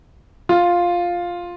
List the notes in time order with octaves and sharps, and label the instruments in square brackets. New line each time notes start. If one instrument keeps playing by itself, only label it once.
[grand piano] F4